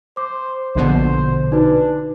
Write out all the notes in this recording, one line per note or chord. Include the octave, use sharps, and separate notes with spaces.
C5 D6
A#1 B2 D3 C5
D4 D#4 F#4 B4